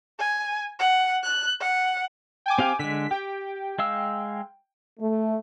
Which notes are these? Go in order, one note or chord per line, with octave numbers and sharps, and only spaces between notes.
G#5
F#5
F#6
F#5
G5 G#5 D6
C4 G4 F5
D3 G#3 B6
G4 G5
G#3 F5 E6
A3